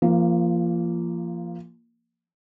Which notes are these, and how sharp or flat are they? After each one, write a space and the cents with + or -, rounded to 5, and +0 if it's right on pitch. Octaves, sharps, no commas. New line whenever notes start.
F3 -25 A#3 +0